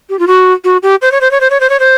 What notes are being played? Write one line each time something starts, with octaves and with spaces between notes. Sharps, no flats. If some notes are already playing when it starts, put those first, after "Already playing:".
G4
F4
F#4
F#4
G4
C5
C#5
C5
C#5
C5
C#5
C5
C#5
C5